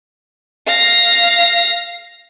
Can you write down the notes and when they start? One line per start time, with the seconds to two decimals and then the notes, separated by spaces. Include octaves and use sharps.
0.67 F5 A#6